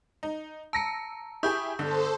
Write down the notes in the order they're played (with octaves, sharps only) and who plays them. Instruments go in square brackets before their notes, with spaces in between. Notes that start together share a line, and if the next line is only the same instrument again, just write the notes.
[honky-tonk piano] D#4
[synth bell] A5 A#5 [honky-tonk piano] E6 A#6 C#7
[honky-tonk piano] E4 G4 G#4 [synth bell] C#6 D#6 G6
[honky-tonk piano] G1 D3 [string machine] A4 C5